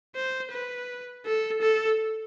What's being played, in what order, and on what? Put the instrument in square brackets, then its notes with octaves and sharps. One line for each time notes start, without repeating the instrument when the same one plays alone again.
[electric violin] C5
B4
A4
A4